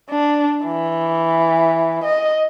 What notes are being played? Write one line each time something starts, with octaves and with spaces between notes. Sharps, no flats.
D4
E3
D#5